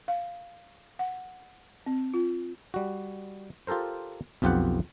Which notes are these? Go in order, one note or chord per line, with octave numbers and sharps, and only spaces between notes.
F5
F#5
C4
F4
G3 F#4
F4 G4 A4 A#4 C5
B1 F2 F4 G4 B4 F#5